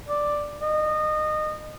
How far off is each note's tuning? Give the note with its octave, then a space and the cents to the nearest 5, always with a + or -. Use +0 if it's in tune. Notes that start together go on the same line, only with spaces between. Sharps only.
D5 +5
D#5 -25